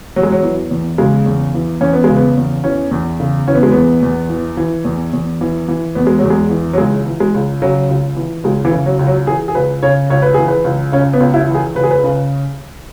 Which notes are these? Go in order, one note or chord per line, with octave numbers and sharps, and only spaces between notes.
E2 F#3
G#3
F#3
E3
E2
C#3 G#3
E2
E3
E2 C#4
B3
C#3 G#3
B3
E2
E3 C#4
E2
C#3
E3 C#4
B3
G#3
E2 B3
E2
E3
E3
E2
E2
E3
E3
E2 B3
G#3
E2 F#3
G#3
E3
F#3
C#2 G#3
E3
G#3
C#2
C#3 F#3
C#2
E3
C#2 G#3
E3
C#3
F#3
C#2
F#3
E3 G#4
G#4
C#2 B4
C#3 C#5
C#2 C#5
B4
E3 G#4
B4
C#2
C#3 C#4
B3
C#2
E4
E3
G#4
C#2 B4
G#4
B4
C#3